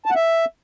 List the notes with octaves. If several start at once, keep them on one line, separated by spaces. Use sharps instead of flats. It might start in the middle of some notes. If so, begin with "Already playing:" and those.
A5
F#5
E5